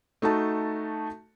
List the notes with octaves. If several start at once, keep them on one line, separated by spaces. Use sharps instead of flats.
A3 D#4 F#4 A5